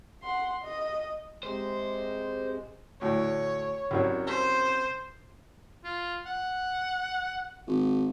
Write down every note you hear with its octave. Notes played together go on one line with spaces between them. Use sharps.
F#5 C6
D#5
C3 G#3 C5
D2 A2 C#5
C2 F#2 C#5
C5
F4
F#5
G#1